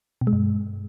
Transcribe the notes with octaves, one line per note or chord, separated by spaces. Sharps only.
B2
G#3
G2